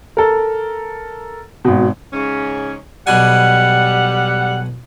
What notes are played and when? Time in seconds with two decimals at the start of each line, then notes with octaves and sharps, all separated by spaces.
0.17 A4 A#4
1.65 G#1 B2
2.12 G#2 C#3 C#4
3.07 B1 B2 G3 F#5 G#5